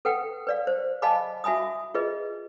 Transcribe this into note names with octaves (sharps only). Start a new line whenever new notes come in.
A4 B4 F#5 G5
B4 D5 F5
C5
D#5 F5 G#5 A5 B5 D6
F#4 E5 G#5 B5 D#6
F4 G#4 B4 D#5